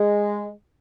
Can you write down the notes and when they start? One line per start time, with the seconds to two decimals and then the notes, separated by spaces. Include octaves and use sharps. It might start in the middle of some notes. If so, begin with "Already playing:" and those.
Already playing: G#3